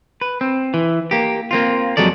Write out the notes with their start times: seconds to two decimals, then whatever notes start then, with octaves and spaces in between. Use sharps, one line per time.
0.21 B4
0.41 C4
0.74 E3
1.11 A#3 G4
1.51 A#3 C4 F4
1.97 F2 F#3 G#3 A4 D5